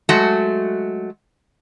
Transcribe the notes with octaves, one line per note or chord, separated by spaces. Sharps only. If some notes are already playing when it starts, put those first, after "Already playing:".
F#3 G#3 A3 F#4